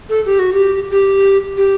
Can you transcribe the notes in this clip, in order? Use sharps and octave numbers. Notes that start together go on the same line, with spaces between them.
A4
G4
F#4
G4
G4
G4